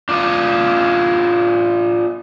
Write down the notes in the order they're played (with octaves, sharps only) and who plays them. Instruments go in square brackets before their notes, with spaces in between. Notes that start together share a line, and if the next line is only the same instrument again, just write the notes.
[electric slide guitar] D4 F4 D#5